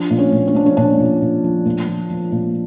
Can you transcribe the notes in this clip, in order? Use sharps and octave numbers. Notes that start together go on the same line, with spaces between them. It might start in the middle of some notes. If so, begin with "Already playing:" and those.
Already playing: F3 D4
A#2
C#4
A#2
C#4
F3 D4
C#4
A#2 D4
A#2
A#2
F3
A#2
F3
F3
A#2